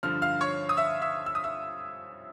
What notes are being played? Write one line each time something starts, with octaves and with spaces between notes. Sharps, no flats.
G2 D3 F3 F6
F5 F6
C#5 C#6
D#6
E5 E6
E5 E6
E6
D#6
E5 E6